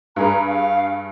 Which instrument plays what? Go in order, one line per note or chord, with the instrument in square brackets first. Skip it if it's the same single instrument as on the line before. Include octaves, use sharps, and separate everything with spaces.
[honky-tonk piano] G2 G#4 B4 [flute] A#5
[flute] F5